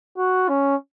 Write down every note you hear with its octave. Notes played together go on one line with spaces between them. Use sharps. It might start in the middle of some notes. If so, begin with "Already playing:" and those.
F#4
C#4